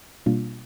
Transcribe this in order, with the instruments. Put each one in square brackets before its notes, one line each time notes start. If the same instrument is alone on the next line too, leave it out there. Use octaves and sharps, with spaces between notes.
[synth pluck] B2 G3 A#3 D4 F4